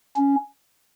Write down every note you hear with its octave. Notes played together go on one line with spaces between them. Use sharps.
C#4